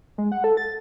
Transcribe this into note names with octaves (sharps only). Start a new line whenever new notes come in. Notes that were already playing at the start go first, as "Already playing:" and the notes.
G#3
F#5
A4
A6